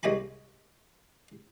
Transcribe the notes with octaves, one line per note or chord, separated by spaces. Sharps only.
C2 G#3 G4 G#5 B5